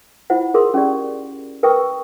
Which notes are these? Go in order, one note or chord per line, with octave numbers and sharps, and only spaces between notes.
E4 F4 C5 F#5
G#4 A#4 C6 D#6
C#4 G4 D5
A#4 B4 G5 C#6 D#6 E6